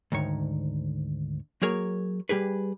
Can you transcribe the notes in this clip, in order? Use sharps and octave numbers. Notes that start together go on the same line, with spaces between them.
D2 G#2 D#3 C#5
F#3 A#3 G#4 A#4 C#5 G#5
G3 G4 G#4 B4